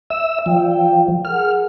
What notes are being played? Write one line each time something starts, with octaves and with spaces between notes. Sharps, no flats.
E5 E6
F3 D5 G5
G#4 A#4 F#5 F6